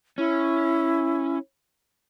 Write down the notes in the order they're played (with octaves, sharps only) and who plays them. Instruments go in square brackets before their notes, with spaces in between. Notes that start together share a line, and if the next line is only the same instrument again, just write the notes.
[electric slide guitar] C#4 [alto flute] E4